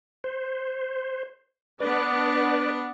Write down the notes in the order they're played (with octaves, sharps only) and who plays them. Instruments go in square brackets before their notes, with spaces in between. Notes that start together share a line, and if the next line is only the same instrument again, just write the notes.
[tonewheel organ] C5
[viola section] B3 D4 [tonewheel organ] B4 D5